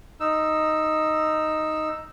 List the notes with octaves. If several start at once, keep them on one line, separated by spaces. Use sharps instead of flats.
D#4 E6